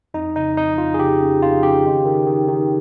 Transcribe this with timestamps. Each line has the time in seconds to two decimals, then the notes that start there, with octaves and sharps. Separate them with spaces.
0.14 F2 D#4
0.35 C#3 D#4
0.56 F2 D#4
0.78 F2 F4
0.94 G#4
0.99 C#3 G4
1.21 C#3
1.41 F2 F4
1.63 C#3 G4
1.84 D#3
2.05 D#3
2.27 D#3
2.48 D#3